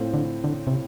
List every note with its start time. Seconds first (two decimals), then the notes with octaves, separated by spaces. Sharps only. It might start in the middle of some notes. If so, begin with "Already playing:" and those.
Already playing: A2 A3 C4 F4
0.14 D3
0.44 D3
0.67 C3